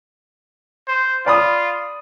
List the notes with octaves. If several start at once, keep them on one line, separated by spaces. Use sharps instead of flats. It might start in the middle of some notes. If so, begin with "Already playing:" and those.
C5
F4 D5 B5 D#6